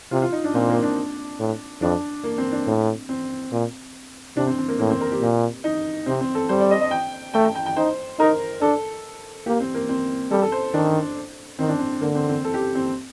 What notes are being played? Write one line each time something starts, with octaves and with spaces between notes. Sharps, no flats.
C3 F4
F4
D#4
D4
A#2 C4
A#3
D4
A2
F2 D4
A#3
C4
D4
A2
C4
A#2
C3 D4
C4
C4
A#3
A2 A#3
C4
A#4
G4
A#2
D#4
C3 C4
C4
A4
G3 C5
D5
D#5
D#5
G5
A3 G5
A5
G5
G5
D#4 C5
D#4 A#4
D4 A4
A#3 G4
C4
A#3
C4
G3 A4
A4
C5
D#3 D4
D#3 C4
D4
C4
D3 A#3
C4
C4
A4
G4
C4